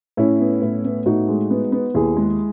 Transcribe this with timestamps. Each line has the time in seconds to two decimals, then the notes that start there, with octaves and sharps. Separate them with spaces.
0.17 A2 C#4 E4
0.40 B3
0.62 A2
0.84 B3
1.06 A2 D#4 F#4
1.28 G#3
1.50 B3
1.72 B3
1.94 D#2 E4 G#4
2.17 G#3